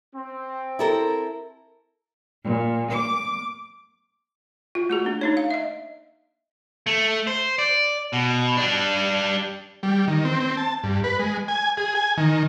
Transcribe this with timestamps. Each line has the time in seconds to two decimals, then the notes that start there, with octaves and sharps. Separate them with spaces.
0.15 C4
0.79 E4 A4 A#4
2.44 A#2
2.91 D6
4.75 F4
4.90 A3 F#4 G#4
5.05 A#3 D4
5.21 D4 D#4 C#5
5.37 F5
5.51 D#5 E5
6.87 A3
7.27 C5
7.59 D5
8.13 B2
8.57 G3 D4
9.83 G3
10.08 D#3
10.25 C4
10.40 C4
10.57 A5
10.84 G2
11.04 B4
11.19 G#3
11.48 G#5
11.77 G#4
11.95 G#5
12.17 D#3